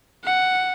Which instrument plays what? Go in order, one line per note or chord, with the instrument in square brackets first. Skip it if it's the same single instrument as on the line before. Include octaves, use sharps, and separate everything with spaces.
[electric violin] F#5